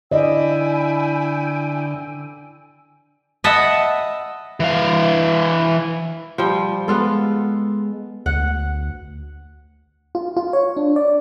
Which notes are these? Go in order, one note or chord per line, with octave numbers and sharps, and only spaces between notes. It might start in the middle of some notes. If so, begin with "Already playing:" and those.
D3 E4 D5 D#5 G5 G#5 E6
D#5 E5 F#5 A5 B5
E3 F5
F3 G3
G#3 B3 F4 A4
D2 F#5
F4
F4
C#5
D4
D5